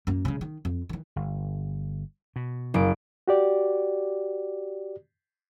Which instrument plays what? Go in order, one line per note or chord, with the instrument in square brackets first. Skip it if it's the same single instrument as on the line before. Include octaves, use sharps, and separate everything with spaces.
[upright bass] F#2 A#3
C#3 G#3
D#3
F2
D#3 E3
[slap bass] G1
B2
[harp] F#1 D7
[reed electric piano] F#4 G4 D5